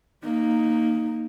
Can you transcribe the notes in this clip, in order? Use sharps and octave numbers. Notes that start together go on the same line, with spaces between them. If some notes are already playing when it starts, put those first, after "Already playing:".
A#3 D#4